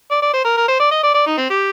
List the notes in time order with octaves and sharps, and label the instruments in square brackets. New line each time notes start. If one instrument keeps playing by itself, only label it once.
[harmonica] D5
D5
C5
A#4
A#4
C5
D5
D#5
D5
D5
D#4
C4
G4